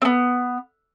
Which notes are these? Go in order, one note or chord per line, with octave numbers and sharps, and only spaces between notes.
B3 C4